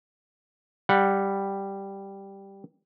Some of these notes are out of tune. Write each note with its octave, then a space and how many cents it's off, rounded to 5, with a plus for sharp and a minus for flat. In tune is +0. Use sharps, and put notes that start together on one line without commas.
G3 +0 F#5 -10